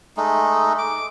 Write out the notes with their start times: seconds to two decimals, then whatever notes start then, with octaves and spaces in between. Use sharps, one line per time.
0.17 G#3 A3 D#4
0.78 D6